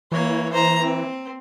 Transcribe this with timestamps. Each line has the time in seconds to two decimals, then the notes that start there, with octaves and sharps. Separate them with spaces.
0.12 E3 A#3 C#5
0.52 C5 A#5
0.82 C4